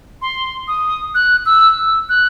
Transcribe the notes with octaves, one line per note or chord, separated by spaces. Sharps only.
C6
D#6
F#6
E6
E6
F#6